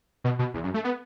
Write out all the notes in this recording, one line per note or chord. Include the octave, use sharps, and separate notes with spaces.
B2
B2
E2
F#2
A3
B3